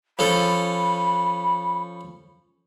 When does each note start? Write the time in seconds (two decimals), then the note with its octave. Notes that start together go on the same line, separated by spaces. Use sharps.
0.19 F3 C#4 A4 B5